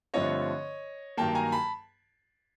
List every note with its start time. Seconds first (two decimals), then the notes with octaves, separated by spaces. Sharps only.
0.14 G2 D3 F3 A3 C4 C#5 D#5
1.17 G2 D#3 F#3 A#3 G5 A5
1.35 G#5 A#5
1.52 A5 B5